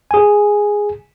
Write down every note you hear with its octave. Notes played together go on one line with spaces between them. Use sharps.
G#4 G#5